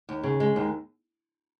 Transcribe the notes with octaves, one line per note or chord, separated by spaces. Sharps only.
D#2
C#3
G#3
D#2